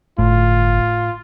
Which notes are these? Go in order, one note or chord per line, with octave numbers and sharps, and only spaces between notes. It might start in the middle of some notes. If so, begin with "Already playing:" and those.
G1 A2 F4